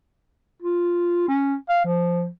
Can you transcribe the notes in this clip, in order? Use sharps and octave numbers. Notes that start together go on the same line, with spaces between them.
F4
C#4
F5
F3